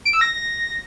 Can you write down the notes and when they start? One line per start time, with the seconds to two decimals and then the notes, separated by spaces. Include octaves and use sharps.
0.05 D7
0.13 E6
0.21 A#6